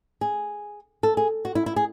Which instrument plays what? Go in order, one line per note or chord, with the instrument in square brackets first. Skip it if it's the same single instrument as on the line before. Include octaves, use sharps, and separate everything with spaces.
[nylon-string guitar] G#4
A4
G#4
F#4
E4
E4
G#4